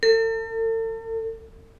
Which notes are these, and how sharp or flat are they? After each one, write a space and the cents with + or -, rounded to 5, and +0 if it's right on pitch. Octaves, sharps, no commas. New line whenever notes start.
A4 +40